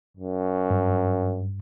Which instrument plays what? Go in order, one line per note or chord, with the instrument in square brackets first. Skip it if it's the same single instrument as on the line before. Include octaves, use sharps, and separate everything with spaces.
[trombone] F#2
[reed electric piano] G2